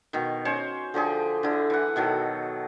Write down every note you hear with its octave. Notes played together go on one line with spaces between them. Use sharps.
B2 D#3
C#4 C5 C#5
D3 F3 G4 G#4
D3 E4
E3 F#5
B2 D#3 F#3 A4